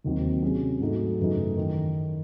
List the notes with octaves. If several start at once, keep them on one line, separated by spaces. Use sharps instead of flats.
D#2 D#3 F#3 C4
C3 F#3 C#4 G#4
G#2 F#3 A3 D#4 F#4
F#2 C#3 E3 A3 D#4
D#3